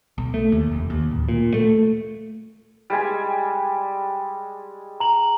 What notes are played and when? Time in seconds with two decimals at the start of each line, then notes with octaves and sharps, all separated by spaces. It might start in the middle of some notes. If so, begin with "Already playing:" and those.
0.18 B1
0.34 A3
0.52 D#2
0.71 F1
0.90 D#2
1.11 D1
1.29 A#2
1.54 A3
2.90 G3 G#3 G#5
5.00 A#5 F#7